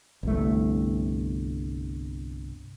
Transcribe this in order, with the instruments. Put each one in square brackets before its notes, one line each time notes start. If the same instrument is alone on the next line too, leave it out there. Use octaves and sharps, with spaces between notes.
[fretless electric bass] G1 C2 A3